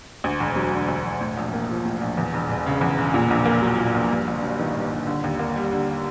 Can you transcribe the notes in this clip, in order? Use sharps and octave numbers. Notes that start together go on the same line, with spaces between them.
D2
E1
F#3
D3
D2
E1
A2
A#1
A#3
F3
A2
A#1
E2
E1
E1
C#3
E2
E1
A#2
A#1
A#3
F#3
A#2
A#1
G2
G1
F#3
D#3
G2
G1
D3
D#2
A#3
G3
D3